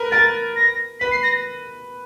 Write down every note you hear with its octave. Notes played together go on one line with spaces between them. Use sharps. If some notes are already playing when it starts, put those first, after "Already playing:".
Already playing: A#4 B4
A#4 A6
A#6
B4 B6
C7
A#6